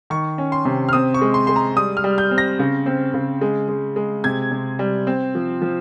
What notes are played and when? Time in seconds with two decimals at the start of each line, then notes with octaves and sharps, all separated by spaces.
0.10 D#3 C#6
0.38 C#4
0.52 C6
0.65 C3
0.89 F6
0.93 C4 D#6
1.14 C#6
1.21 G#3
1.34 C6
1.47 G#3 C6
1.56 A#5
1.76 G3 D#6
1.97 F6
2.04 G3
2.18 G6
2.31 C4
2.38 A#6
2.59 C#3
2.86 C4
3.14 C#3
3.41 G#3
3.69 G#3
3.96 G#3
4.24 C3 G#6
4.52 C3
4.79 G3
5.07 C4
5.35 F3
5.62 F3